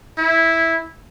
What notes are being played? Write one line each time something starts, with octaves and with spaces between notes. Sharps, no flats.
E4